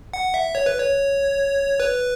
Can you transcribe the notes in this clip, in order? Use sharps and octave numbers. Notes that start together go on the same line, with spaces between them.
F#5
E5
C#5
B4
C#5
B4